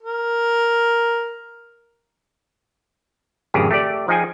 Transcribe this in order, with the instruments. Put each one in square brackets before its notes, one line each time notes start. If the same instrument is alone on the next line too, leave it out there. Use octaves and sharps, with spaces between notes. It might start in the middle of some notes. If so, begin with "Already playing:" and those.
[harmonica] A#4
[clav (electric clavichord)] G#1 F2 C#3 G4 G#4
A3 G4 D5
F3 D#4 G#4 G5 G#5